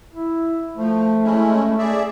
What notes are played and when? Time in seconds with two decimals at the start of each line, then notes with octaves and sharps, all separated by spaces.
0.12 E4
0.77 F3 A3
1.24 G#3 C#4 E4
1.78 G#4 D5 E5